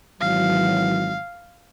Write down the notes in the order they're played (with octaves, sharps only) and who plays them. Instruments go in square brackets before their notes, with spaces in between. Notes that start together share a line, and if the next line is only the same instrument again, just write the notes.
[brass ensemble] G#1 E3 F#3 [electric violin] F5